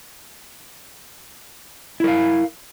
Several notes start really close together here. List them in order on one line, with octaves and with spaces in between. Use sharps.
E4 A#4 F5